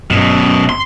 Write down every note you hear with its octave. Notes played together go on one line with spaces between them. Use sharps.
G1 F#2 B2
C6